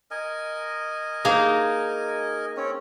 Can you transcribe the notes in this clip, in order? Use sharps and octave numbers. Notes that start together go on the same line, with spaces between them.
A#4 D#5 G#5
A#3 D#4 G#4
C4 C#4 C#5